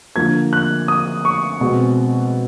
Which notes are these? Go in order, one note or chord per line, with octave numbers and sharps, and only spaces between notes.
D3 F3 A#3 G#6
F#6
D#6
C#6
B2 G#3 C4